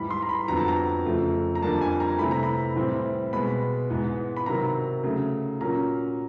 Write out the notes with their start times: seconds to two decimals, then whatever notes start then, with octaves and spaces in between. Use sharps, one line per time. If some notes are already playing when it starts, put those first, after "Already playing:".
Already playing: G#2 E3 G3 B5
0.10 C6
0.22 A#5
0.29 B5
0.48 F2 D3 F#3 B3 A#5
0.58 A5
0.68 A#5
1.05 F2 C#3 F3 A3
1.55 A#5
1.62 F2 D3 G3 A#3 A5
1.81 G#5
2.00 A#5
2.19 C3 E3 A3 B5
2.31 A#5
2.43 B5
2.76 A2 E3 G3 C4
3.33 B2 G#3 B3 B5
3.90 G#2 E3 G#3 B3
4.36 B5
4.46 C3 D#3 F#3 A#5
5.03 C#3 F#3 A3
5.61 A#2 F#3 A#3 C#4 A#5